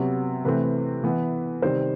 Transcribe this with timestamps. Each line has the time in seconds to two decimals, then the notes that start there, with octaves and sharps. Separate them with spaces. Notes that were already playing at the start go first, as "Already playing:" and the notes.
Already playing: C3 F#3 B3
0.44 C3 E3 A3 C4 B4
1.04 E3 B3
1.62 C3 D#3 G3 C4 C5